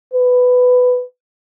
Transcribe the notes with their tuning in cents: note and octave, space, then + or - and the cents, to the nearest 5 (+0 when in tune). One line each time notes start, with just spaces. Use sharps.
B4 +10